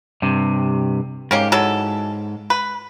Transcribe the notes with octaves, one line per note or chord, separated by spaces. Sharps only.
G2 C3
G#2 A#3 C#4 G4
E3 F#3 A4
B4